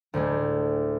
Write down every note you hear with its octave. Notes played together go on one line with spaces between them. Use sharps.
D2 A2 G3 G#3